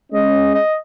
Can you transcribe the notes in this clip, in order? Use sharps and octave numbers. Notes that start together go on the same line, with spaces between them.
G#3 C#4 D#5
D#5